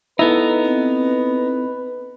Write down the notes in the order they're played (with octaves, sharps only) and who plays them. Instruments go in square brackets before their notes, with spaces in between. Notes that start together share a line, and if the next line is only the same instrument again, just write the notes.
[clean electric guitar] B3 D#4 [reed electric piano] E4 A4 [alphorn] B4
[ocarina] C4